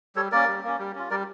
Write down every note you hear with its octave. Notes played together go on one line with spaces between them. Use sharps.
G3 A4 C#5
A#3 C#4 A#4 D5
G3
A#3 C#4
G3
C#4 F4
G3 A#4 D5